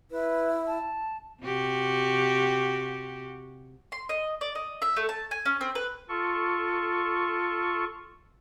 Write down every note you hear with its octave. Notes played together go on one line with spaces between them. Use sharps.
E4 B4
A5
C3 F#4 G4
C6
D#5
D5
D#5
E5
A3
A5
G#5
C#4
C4
B4
F4 A4 C#6